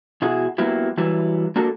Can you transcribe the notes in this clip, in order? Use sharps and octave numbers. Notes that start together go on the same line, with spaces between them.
B2 E4 F#4 G#4
F#3 A#3 B3 E4 G4
E3 F#3 G3 E4 B4
A#3 D4 F#4 A4 A#4